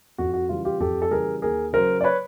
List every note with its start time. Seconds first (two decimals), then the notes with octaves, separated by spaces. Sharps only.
0.18 F2 F#4
0.34 F#4
0.49 C#3 E3 G3 F4
0.65 F4 G4
0.80 F2 G4 A4
1.02 A4
1.11 C#3 E3 G3 G#4 A#4
1.42 D#2 G#4 A#4
1.73 C#3 F#3 A#4 C5
2.01 D5
2.04 B4 C#5